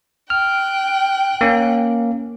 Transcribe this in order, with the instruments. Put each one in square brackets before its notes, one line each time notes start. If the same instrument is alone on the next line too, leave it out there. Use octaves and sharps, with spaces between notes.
[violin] G5 F#6 [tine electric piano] F6
[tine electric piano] A#3 C#4